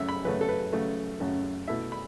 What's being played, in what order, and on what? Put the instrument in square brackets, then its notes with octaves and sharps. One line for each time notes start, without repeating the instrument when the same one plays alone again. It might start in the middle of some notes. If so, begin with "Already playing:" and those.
Already playing: [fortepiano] F#2 C#3 A3 C#4 C#5 E5
B5
F#2 C#3 A3 C#4 B4
A4
B4
F#2 C#3 A3 C#4
F#2 C#3 A3 C#4
B2 A3 E4 E5
B5